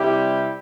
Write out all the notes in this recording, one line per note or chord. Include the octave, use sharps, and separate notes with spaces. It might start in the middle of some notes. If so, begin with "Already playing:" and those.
Already playing: C3 G3 E4 G4